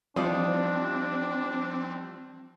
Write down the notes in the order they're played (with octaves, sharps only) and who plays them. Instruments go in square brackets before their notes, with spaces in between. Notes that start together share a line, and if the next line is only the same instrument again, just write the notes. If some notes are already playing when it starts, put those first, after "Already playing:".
[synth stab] E3 F3 G3 [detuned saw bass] C4 [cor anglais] D4 [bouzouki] D#4 D5 F5